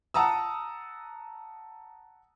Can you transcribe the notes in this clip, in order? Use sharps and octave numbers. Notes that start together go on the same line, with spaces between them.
F#5 A5 A#5 D#6 E6